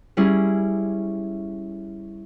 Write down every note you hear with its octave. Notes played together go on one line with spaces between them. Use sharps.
G3 C#4 E4 G#4